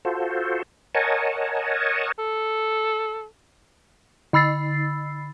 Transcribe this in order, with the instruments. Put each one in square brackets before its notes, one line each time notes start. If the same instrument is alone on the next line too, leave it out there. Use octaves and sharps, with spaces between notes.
[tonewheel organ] F4 F#4 A4 C5
A#4 C#5 D#5 F#5 G#5 A5
[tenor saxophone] A4
[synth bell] D3 B5 E6 A6 C7